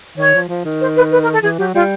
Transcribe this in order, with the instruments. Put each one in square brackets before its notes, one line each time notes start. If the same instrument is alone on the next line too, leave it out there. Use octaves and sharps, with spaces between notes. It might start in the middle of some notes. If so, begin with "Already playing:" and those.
[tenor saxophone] D#3 [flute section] C#5
[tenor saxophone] F3
F3
D#3
[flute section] C5
B4
B4
A#4
A4
[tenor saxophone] E3 [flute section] G#4
[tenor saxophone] F#3 [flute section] G4
[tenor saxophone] G3 [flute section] F4